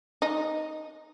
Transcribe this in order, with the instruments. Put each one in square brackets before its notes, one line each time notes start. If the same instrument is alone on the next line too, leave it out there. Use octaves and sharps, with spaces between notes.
[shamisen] D#4